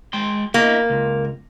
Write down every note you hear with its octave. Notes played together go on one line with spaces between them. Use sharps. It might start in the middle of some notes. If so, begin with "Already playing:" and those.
G#3 G5 C6
A#3 E4 D#5
C#2